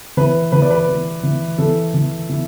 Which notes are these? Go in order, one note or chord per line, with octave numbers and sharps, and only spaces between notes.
E3 B4
E3 B4
D5
B4
E3
E3
E3 A4
E3
E3